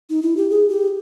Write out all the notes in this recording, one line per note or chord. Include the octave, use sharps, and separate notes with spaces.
D#4
E4
G4
G#4
G4